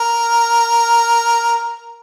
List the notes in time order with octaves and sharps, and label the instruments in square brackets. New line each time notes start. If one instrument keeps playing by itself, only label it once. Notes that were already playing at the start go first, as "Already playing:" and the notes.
Already playing: [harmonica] A#4